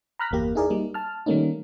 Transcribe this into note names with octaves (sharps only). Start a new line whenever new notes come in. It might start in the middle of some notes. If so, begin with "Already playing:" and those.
A#5 B5 F6 F#6 A#6 B6
G1 E2 A#3 G4
D#4 E4 G#4 A#4 D5
G3 A#3 D#4
A5 F6
D#3 G3 A3 A#3 C#4 D#4